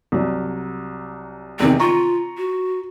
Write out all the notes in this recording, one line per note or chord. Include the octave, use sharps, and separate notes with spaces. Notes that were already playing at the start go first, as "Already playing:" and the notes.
C2 F#3
E2 C3 D#3 C4
F4 A#5 C#6
F#4